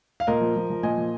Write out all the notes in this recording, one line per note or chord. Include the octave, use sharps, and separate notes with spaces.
F5
A#2 A#4 D#5
F3
F3
F3
A#2 D#5 G#5
F3